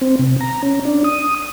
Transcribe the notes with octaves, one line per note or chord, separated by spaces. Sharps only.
C4
C3
A#5
C#4
D4
D#6